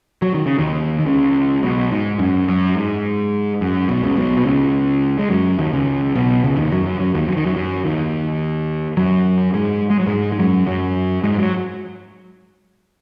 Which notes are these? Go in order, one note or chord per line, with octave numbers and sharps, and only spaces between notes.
F#3
D#3
C#3
D#2 D#3
D#3
C#2 C#3
B1 B2
G#2
F#2
F#2
G#2
F#2
B1 B2
C#2 C#3
B1 B2
B2
C#2 C#3
G#3
F#2 F#3
D#2 D#3
C#2 C#3
B1 B2
C#2 C#3
D#2 D#3
F#2 F#3
F#2 F#3
F#2 F#3
D#2 D#3
F#3
D#3
F#2 F#3
F#2 F#3
D#2 D#3
F#2 F#3
G#2 G#3
G#3
F#3
G#2 G#3
G#3
F#2 F#3
F#2 F#3
G#2 G#3
F#3